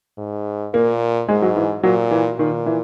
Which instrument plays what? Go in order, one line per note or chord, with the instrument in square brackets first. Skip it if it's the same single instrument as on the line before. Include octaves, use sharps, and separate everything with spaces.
[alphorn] G#2
[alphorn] A#2 [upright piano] A#3
[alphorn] G#2 [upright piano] G#3
[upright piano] F#3
E3
[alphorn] A#2 [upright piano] F#3
[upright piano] E3
[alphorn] A#2 [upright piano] D#3
[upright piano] E3